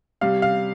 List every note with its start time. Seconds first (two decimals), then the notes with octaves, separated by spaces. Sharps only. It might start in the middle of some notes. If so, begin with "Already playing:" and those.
0.21 C3 G3 F5
0.42 F5